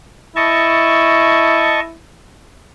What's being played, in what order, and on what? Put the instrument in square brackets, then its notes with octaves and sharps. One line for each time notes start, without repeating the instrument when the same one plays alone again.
[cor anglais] E4 [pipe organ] D#5 A5 C#6